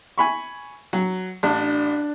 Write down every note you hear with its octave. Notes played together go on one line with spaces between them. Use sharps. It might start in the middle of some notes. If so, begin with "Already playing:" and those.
G#5 B5 C#6
F#3
A1 D4